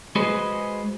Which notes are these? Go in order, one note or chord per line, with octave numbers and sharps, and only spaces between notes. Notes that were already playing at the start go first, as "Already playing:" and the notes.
G#3 F#4 G#4 B4 C5 D#5